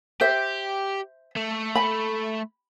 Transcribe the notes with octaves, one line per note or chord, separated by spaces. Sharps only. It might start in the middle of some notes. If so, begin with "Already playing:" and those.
G4 C5 E5
A3
B5